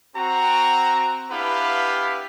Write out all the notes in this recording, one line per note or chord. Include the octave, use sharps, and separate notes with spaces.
C4 F#4 A#5
B3 D4 E4 G4 B4 F5